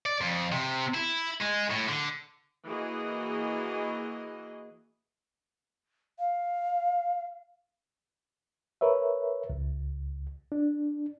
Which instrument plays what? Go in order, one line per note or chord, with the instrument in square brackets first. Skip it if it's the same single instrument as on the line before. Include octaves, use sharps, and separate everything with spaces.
[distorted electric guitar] D5
F2
C3
E4
G#3
A2
D3
[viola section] E3 A#3 F#4 G#4 D#5
[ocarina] F5
[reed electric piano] A#4 B4 C#5 E5
C#2
D4